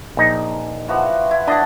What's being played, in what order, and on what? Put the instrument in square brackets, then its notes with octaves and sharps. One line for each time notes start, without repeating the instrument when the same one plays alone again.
[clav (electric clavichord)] A#1 D#4
[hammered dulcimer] E3 F3 F#4
E4
[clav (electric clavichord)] D4 [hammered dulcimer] D#5 F#5 A5